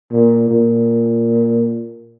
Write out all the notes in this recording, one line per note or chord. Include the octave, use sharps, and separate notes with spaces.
A#2
A#2